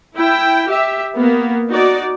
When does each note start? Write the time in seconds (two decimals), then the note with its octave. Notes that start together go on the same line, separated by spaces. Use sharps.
0.16 E4 G5
0.69 G4 E5
1.13 A#3 B3
1.70 D#4 F#4 D5